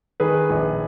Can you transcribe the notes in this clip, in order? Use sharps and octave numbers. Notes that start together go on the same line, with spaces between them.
D#3 G#4 B4
A#1